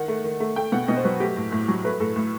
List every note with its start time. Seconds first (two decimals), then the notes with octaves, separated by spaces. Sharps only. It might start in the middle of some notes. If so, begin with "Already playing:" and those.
Already playing: D#3 F#5
0.08 A3
0.24 D#3
0.40 A3
0.56 A3 G5
0.72 B2 F#5
0.88 B2 D#5
0.97 C5
1.04 F#3 B4
1.20 A3 G4
1.37 A2
1.52 A2
1.68 F#3
1.84 A3 B4
2.00 A2 A4
2.16 A2